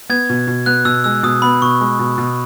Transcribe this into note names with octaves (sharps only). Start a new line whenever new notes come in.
B3 G#6
B2
B2
B3 F#6
B2 E6
G#3 E6
B2 D#6
B3 B5
B2 C#6
G#3
B2
B2